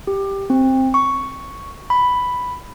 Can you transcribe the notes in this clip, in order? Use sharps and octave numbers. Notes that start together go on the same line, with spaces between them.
G4
C4
C#6
B5